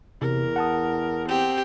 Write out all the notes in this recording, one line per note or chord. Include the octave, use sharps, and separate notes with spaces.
E2 C3 A#4
F#5 A5 D#6
C4 G4